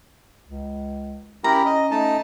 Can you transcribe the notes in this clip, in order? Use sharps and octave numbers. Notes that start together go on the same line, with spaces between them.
C#2
C#4 E4 G4 A#4 A#5
D#5
A3 D#4 A5